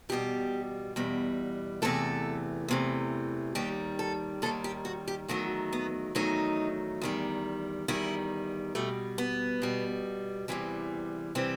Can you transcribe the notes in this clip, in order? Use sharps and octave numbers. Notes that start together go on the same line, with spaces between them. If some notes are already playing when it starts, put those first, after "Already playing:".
E2 B2 G3 G4
E2 B2 G3
E2 C3 E3 A3 A4
E2 C3 E3 A3
D#2 D#3 G3 G4
A4
D#2 D#3 G3 A4
G4
F#4
G4
E2 D#3 F#3 A3 F#4
B3
E2 D#3 F#3 A3 D#4
E2 D#3 G3
E2 D#3 G3 E4
B2 G3 A3
B3
B2 G3
E2 C3 E3 G3
C3 E3 G3 C4